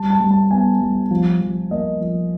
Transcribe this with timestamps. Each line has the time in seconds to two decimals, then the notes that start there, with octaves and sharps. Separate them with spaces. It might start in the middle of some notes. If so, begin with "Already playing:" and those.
Already playing: G3 A5
0.10 A5
0.20 G3
0.31 A5
0.50 B3 G#5
0.81 G3
1.11 F3
1.41 F3
1.71 A#3 D#5
2.01 F3